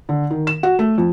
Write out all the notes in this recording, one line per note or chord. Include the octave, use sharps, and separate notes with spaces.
D3
D#3
E7
F#4
A3
F2